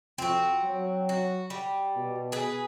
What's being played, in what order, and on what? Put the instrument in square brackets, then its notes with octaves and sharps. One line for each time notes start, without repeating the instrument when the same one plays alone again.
[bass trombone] F2 [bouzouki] C4 F#4
[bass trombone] F#3
[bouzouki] F#4
G3
[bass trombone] B2
[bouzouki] G#4 B4